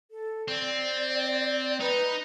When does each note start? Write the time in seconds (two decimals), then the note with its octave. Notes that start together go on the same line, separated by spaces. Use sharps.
0.11 A4
0.48 C4 D5
1.80 D#4 B4